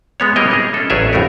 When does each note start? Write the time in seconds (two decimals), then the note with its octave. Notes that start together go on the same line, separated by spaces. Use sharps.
0.20 G#3 B3 C#5
0.36 G3 A#3 E4 A#4 C#5 D#5
0.51 G#4 D#5
0.74 C#4 A4
0.90 A1 F#3 G#4 C#5 D5 E5
1.13 G1 F2 A2 A3 F#4 A#4